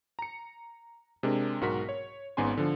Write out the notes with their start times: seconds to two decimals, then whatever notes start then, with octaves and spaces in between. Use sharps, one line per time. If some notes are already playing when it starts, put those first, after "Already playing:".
0.19 A#5 C#7
1.23 C3 G#3 D4 A#4
1.61 B1 G#2 F#4 A#4 B6
1.89 C#5
2.37 G#1 G#2 B3 C#4 G#5 C6
2.57 D3 F3